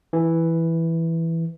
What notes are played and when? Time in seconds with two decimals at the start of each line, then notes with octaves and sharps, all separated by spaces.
0.13 E3